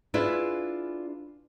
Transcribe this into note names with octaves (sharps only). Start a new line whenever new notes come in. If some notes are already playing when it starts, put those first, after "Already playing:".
D4 E4 F4 G#4 B4